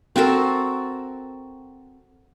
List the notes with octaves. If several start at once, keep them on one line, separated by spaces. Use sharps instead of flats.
C4 F#4 A4 A#4